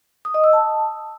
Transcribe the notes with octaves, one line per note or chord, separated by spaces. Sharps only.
D#6
D#5
E6
A5